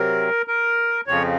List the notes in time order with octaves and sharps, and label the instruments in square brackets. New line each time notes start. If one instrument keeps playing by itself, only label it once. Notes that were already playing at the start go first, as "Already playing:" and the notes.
Already playing: [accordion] C3 F#3 C4 A#4
A#4
F2 C#3 F3 C4 C#5